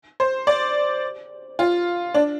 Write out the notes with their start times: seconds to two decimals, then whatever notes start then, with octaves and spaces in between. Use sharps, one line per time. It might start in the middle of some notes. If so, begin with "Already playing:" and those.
0.20 C5
0.47 D5
1.59 F4
2.14 D4